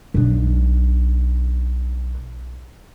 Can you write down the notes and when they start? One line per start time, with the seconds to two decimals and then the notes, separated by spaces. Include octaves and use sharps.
0.14 B1 D4